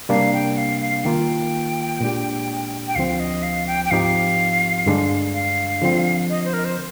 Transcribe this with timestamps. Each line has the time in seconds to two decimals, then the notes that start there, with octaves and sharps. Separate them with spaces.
0.09 C3 G3 A#3 D4 F5
0.33 G5
0.57 F5
0.81 F5
1.05 D#3 A#3 F4 G5
2.01 A#2 G#3 D4 G4
2.88 G5
2.95 D2 D3 F3 C4 F5
3.20 D#5
3.43 F5
3.67 G5
3.85 G5
3.91 G#2 F3 C4 D#4 G4 F5
4.86 G2 D3 G#3 D4
5.33 F5
5.82 D3 F3 C4
6.29 D#5
6.45 C5
6.53 A#4
6.65 C5